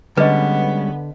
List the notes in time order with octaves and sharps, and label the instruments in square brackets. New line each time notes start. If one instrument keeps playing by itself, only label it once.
[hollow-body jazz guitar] D3 [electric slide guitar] G3 G#3 C#4 [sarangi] B3 [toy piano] B4 D#5